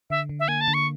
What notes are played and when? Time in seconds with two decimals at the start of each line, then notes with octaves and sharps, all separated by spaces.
0.10 D3 E5
0.29 D3
0.40 E5
0.48 A#3 G#5
0.61 A5
0.68 D3
0.74 C#6